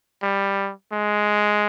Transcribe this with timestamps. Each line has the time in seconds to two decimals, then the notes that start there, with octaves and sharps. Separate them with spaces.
0.22 G3
0.93 G#3